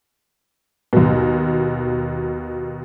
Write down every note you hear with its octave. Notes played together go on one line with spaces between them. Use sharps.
D#2 B2